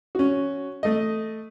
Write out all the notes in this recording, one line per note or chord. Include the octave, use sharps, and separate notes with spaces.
C#4 F#4
A3 D#5